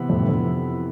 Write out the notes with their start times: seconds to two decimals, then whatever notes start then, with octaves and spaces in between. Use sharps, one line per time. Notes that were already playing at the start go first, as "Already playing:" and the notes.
Already playing: C3 E3 B3
0.09 F2 A2
0.20 G2
0.29 F2